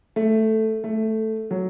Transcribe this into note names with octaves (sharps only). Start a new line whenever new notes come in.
A3
A3
F#3